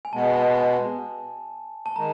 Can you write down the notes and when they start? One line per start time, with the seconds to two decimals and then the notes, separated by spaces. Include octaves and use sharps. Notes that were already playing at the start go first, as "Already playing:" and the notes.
0.05 G#5
0.13 B2 G#3 B3 A5
1.86 A5
1.96 D#3 G#3 A#5